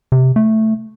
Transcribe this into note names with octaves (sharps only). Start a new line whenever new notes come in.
C3
A3